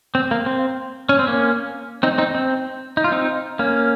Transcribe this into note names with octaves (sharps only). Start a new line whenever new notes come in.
C4
A#3
C4
C#4
C4
A#3 C#4
C4 D#4
C4 D#4
C4
D#4
F4
C4 D#4
A#3 C#4